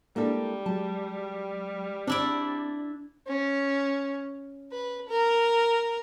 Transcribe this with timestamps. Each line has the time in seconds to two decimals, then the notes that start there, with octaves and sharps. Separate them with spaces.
0.16 G3 G#3 A#3 D4 E4 A4
0.66 F#3 G#3 A5
2.07 C4 D4 E4 D5
3.27 C#4
4.72 B4
5.08 A#4